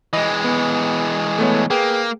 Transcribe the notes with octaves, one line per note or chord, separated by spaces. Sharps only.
E3 G#3 D#5
B3
A3 B3 C#5
A#3 G#4 B4 G5